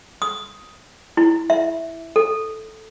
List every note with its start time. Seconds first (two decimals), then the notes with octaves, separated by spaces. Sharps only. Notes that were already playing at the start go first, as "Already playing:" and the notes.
0.22 D#6
1.17 E4
1.50 E5
2.16 A4